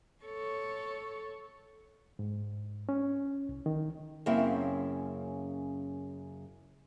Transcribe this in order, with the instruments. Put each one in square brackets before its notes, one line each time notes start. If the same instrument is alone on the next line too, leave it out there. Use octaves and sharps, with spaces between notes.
[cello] A4 C#5
[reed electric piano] G#2
C#4
C2
D#3
[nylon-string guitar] F#2 C#3 A#3 C4 E4